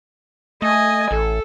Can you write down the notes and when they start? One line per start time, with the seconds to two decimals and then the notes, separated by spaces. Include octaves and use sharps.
0.62 A3 D#5 G#5
1.11 A1 A4